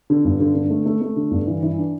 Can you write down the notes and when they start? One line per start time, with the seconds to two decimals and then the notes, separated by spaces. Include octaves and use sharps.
0.10 D3
0.25 G2
0.40 D3
0.55 D3
0.70 A3
0.86 A3
1.01 A3
1.16 D3
1.31 G2
1.47 E3
1.63 E3
1.78 D4